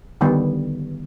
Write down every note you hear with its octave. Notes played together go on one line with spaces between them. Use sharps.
D3 D#3 G3 B3